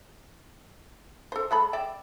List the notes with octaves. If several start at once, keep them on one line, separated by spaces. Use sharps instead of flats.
A4 C5
G#3 A4 B5
D5 E5 G5